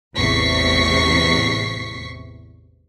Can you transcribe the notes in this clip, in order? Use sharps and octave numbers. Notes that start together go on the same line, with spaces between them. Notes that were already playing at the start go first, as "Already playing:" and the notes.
A1 E2 C3 C#6 B6 C7